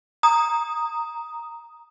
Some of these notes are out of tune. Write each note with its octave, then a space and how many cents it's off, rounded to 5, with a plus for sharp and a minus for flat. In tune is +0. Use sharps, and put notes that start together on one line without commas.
A#5 +0 D#6 +0